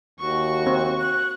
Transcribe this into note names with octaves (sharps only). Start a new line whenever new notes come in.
D#2 F#4 C#6
C4
F#6